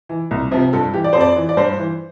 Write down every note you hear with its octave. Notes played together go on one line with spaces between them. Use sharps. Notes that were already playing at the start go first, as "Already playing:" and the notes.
E3
C2
C3 F3
G2 A4
E3 G4
D5
F2 C5
D5
E3
D5
G2 C5
E3